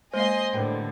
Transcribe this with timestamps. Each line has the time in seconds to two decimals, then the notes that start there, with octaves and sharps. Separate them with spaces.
0.14 G#3 A#3 C5 D#5 F5 G#5 C6
0.53 A2 D3 G3 A#4 B4 G5